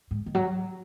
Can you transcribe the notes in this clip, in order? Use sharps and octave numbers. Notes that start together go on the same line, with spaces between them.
G#2
D#3
F#3